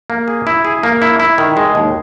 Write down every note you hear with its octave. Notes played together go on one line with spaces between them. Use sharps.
A#3
G#4
E4
G#4
A#3
E4
E4
D#3
G#3
D#2